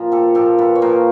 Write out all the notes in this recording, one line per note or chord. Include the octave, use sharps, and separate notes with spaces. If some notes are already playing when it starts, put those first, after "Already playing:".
Already playing: A#2 F3
G4 A4
A#2 F3 G4 A4
A4 B4
C#5
A#2 F3 A#4 C5